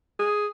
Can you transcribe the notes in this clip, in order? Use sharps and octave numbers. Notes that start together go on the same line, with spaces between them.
G#4